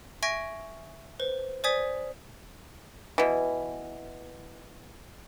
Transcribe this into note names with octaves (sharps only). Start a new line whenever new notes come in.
E5 G#5 C#6 G#6 A#6 D7
B4 C5
C5 D5 G#5 D#6 G#6 B6
B2 E3